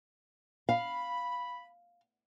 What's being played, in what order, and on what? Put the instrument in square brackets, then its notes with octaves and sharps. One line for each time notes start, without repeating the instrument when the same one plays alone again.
[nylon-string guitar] F5 [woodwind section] B5